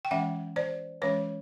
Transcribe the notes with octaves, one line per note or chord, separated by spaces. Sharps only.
G5
E3 G#3 C#4 E5 F#5
C5 D5
E3 G#3 C#4 B4 C#5